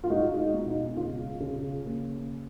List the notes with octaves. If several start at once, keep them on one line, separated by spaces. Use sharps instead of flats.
F4
G#3 D#4 F#4
D#4
B2
D#4
C#3 F4
C#3
A#3